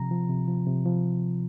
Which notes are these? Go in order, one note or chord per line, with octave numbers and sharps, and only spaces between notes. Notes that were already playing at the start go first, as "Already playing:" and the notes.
Already playing: C3 F3 A#5
F3
C3
F3
C3
F3